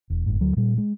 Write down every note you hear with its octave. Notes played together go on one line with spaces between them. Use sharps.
E1
F#1 G#2
D2 F#3
A#2 G3
G#3